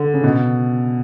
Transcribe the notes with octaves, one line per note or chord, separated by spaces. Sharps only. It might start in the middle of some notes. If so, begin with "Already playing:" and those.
Already playing: D3
C#3
B2